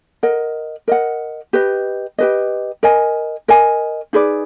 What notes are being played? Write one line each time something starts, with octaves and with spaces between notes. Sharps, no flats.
A#4 D#5 F#5
A#4 D#5 F#5
G4 B4 D#5
G4 B4 D#5
A#4 D#5 G#5
A#4 D#5 G#5
D#4 G#4 B4 D5